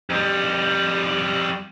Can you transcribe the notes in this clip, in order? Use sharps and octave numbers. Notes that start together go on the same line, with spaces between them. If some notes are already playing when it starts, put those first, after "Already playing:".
F2 G3